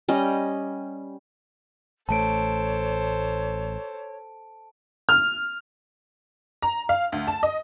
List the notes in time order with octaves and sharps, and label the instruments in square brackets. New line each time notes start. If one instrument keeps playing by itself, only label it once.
[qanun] G3 C#4 D#5
[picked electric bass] A1 A3 [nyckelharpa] A4 C5 [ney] C#5 [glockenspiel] A5 D7
[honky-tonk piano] F6
A#5
F5
D2
A5
D#5